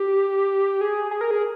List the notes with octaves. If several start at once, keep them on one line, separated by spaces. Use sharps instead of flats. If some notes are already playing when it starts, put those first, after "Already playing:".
Already playing: G4
G#4
G#4
A#4
G#4